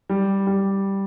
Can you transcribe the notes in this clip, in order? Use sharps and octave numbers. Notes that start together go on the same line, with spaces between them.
G3
G3